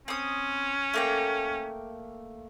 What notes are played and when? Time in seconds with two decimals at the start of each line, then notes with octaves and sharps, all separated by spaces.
0.08 C4 C#4 D#6
0.94 A3 A#3 G5